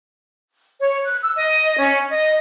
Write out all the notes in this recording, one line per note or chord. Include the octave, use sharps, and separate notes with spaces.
C#5
F#6
E6
D#5
C#4
D#5